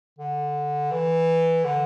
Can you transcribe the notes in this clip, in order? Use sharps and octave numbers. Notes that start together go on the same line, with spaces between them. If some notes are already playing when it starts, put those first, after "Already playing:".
D3
E3
D3